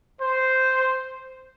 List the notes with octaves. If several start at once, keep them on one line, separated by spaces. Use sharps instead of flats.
C5